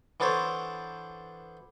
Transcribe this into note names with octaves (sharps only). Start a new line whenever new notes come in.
E3 B3 D4 A4 C5 C#5